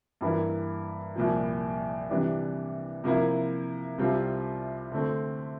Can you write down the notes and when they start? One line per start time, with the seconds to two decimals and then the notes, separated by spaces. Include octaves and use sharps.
0.21 G2 E3 A#3 E4
1.16 C2 A#2 F3
2.09 C3 E3 G3 D4
3.04 C3 F3 A#3 E4
3.98 C2 C3 G3 C4 F4
4.92 D3 A3 C4